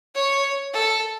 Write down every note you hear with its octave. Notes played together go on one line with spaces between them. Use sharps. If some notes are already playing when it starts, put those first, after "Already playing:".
C#5
A4